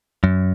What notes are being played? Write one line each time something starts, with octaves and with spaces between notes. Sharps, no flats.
F#2